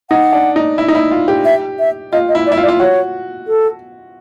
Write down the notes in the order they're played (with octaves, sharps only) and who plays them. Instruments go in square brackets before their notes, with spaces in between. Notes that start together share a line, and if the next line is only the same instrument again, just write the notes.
[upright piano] D#4 [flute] F#5
[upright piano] D4
D#4
E4
D#4
E4
F4
G4
[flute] E5
E5
[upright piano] F4 [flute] D#5
[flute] D#5
[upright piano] E4
[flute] D5
[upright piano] E4
F4
[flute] D5
[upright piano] F4
[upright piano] F#4 [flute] C#5
[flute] A4